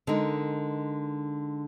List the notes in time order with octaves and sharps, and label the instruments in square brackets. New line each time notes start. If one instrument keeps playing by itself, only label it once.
[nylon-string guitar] D3 G#3 D#4 A#4